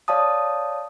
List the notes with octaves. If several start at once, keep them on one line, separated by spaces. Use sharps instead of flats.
C#5 D5 F5 A5 D#6